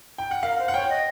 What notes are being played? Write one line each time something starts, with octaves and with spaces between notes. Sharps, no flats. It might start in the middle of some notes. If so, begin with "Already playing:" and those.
G5
F#5
A#4 F5
C5
F#5
C#5 G5
D#5